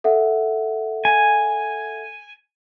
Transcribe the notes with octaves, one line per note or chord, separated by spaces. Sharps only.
A4 E5 F#5
G#5